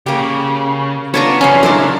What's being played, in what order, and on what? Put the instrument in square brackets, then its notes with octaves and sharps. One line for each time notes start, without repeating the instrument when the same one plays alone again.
[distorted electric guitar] C#3 [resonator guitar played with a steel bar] A#3 G4
[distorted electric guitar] B3 [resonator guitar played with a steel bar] C#4 D4 F4 [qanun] C#5 A5 A#5
[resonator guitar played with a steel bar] F#2 C#3 F3 [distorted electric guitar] E3 F#4 [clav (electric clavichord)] C#4
[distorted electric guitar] F#3 G#3 [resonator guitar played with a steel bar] D4 E4 C5 [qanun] A#4